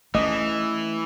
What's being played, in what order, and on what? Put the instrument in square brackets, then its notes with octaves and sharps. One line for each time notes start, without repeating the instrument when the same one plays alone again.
[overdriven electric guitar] E3 [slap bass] A3 C4 C#4 [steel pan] D#5